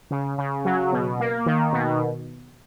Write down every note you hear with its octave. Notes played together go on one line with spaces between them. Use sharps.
C#3
C#3
F#3
B2
A#3
D#3
B2